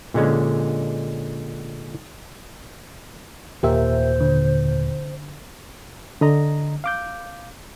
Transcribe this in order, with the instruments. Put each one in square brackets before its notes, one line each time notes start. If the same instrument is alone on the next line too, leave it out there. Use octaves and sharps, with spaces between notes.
[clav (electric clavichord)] A#2 D3 G#3 C#4
[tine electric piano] D#2 A#2 [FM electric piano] G4 A#4 E5 [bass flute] C5
[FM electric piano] D3
[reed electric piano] D3 D#5 A#5
F5 D6 G6